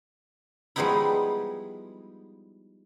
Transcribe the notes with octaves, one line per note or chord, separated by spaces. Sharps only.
F3 G3 G#3 B3 D#4 E4